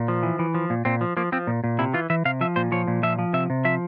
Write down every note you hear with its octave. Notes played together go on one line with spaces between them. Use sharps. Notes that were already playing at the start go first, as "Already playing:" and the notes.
Already playing: A#2
F3
E3
E3
F3
A#2
A#2 C4
F3
F3 A#3
F3 C4
A#2
A#2
C3 E4
E3 F4
E3 E5
C3 F5
F3 E5
A#2 C5
F3 C#5
A#2
F3 E5
F3
C3 E5
C3
F3 E5